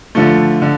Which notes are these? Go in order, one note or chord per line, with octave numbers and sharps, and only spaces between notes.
D3 F3 A3
D3